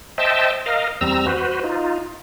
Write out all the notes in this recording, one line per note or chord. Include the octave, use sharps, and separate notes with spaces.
C5 D#5 E5 G5 A5
A#4 D#5 F5
E2 G3 C4 A#5 E6
F#4 B4 C5
D#4 F4